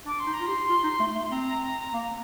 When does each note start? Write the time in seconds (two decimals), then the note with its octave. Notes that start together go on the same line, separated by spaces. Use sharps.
0.06 D4 D6
0.19 C6
0.26 D#4
0.33 A#5
0.40 F4
0.46 G4 C6
0.69 F4
0.84 D#4
1.00 A3
1.15 A3
1.31 C4 A#5
1.94 A#3